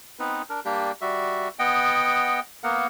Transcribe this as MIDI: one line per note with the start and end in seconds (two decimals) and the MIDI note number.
0.19 0.42 59
0.19 0.42 60
0.19 0.42 63
0.19 0.42 71
0.50 0.60 62
0.50 0.60 70
0.65 0.92 55
0.65 0.92 58
0.65 0.92 62
0.65 0.92 67
1.01 1.48 55
1.01 1.48 66
1.01 1.48 76
1.59 2.40 59
1.59 2.40 75
1.59 2.40 78
1.59 2.40 79
2.64 2.87 58
2.64 2.87 59
2.64 2.87 70
2.64 2.87 78